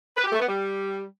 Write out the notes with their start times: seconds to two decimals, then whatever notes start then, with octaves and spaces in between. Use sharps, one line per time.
0.17 B4
0.24 G4
0.32 A3
0.40 B3
0.47 G3